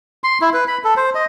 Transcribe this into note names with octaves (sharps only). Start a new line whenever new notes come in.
C6
E4
B4
B5
A4
C5
D#5